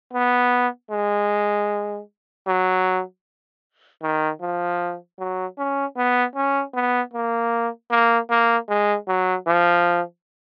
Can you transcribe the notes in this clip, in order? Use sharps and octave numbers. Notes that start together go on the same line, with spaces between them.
B3
G#3
F#3
D#3
F3
F#3
C#4
B3
C#4
B3
A#3
A#3
A#3
G#3
F#3
F3